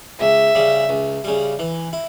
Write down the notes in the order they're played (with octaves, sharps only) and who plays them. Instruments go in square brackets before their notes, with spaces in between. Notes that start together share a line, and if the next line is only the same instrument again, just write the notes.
[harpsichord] C#2 [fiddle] E5
[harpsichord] C#3 G3
C#2
C#3 G3
E3
E4